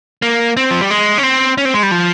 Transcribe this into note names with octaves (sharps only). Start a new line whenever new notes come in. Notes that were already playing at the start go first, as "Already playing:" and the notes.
A#3
C4
F3
G3
G#3
C#4
C4
C#4
C4
G#3
G3
F3